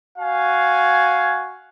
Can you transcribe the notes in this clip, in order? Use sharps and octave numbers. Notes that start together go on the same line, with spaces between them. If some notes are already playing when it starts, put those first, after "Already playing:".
F#4 F5 G#5